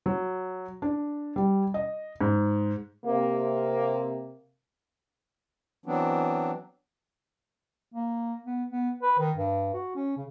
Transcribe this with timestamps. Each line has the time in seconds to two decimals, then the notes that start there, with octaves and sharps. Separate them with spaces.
0.06 F#3
0.82 D4
1.36 G3
1.74 D#5
2.21 G#2
3.06 C3 A#3
5.86 E3 F#3 B3 C4 D4
7.94 A#3
8.46 B3
8.71 B3
9.02 B4
9.18 D#3
9.37 G2
9.74 F#4
9.95 C#4
10.17 C#3